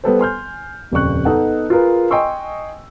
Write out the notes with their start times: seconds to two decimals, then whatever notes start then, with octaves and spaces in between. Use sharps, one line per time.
0.04 G3 B3 A4 C5
0.19 G#5 C6 F6 G6
0.92 D#1 F2 C#3 D5 C#6 F#6
1.25 B3 D#4 A4 D#5 F#5
1.70 F4 G#4 A#4 B4
2.11 D#5 G5 G#5 C6 C#6 E6